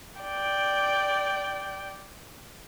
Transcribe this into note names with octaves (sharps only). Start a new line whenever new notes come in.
D5 G5